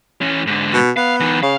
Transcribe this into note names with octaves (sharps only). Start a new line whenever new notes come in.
E3 C#4
G#2 D3
B2
B3 F5
E3 D#4
C#3 F5